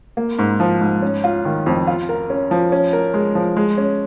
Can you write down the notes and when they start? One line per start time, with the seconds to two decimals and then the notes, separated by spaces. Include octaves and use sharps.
0.17 A#3
0.39 G#2
0.60 F3
0.81 G#2
1.02 C#4
1.24 F4
1.45 D#3
1.66 F2
1.87 F4
2.09 A#4
2.30 C#4
2.51 F3
2.72 C#4
2.93 A#4
3.14 G#3
3.35 F3
3.56 G#3
3.78 C#4